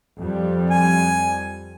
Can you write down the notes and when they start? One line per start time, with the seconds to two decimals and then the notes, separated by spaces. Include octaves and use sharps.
0.21 F2 G3
0.71 G#5